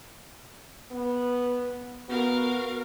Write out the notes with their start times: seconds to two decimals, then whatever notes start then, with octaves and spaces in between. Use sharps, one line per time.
0.91 B3
2.09 B3 F#4 A#4 F5